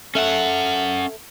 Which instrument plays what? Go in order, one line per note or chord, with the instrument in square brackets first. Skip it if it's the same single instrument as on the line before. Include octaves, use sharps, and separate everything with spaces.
[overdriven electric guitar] C#4 F#5 [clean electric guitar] A4 E5